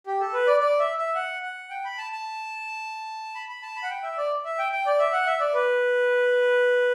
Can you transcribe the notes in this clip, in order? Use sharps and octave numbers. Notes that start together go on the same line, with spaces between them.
G4
A4
B4
D5
D5
E5
E5
F#5
F#5
G5
B5
A5
A5
B5
B5
A5
B5
F#5
G5
E5
D5
E5
G5
G5
D5
E5
F#5
E5
D5
B4